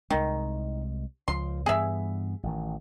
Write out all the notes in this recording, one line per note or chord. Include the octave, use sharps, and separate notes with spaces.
C2 D#3 G#3
C#2 F3 C6
G2 E3 B3 G#4 E5
A1 D#3